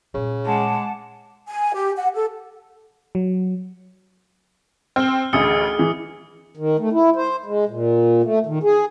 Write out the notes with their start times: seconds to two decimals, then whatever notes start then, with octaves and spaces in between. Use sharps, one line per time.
0.14 A#2 C#3 G3
0.46 G#3 F#5 A5 D6
1.48 G#5
1.73 G4
1.96 F#5
2.15 A4
3.15 F#3
4.96 C4 F6 G7
5.33 A1 D2 G#4 D#6 C#7 G7
5.79 E3
6.57 D#3
6.79 A3
6.92 E4
7.16 C5
7.46 G#3
7.68 A#2
8.24 A3
8.46 D#3
8.63 G#4